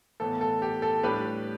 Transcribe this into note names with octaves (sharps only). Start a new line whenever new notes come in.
A2 E3 B3 A4
A4
G4
A4
A2 G3 D4 G4 B4